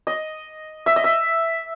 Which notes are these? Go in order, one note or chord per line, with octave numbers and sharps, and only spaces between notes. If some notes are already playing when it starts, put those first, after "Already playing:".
D#5
E5
D#5
E5